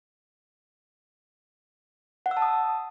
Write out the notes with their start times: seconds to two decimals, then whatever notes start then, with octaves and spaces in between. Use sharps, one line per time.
2.26 F#5
2.31 E6
2.37 A5
2.42 D#6